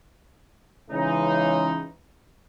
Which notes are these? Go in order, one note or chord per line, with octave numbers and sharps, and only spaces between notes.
C#3 E3 G#3 D#4